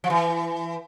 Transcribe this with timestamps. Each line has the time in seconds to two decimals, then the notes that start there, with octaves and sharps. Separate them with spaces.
0.04 F3
0.10 E3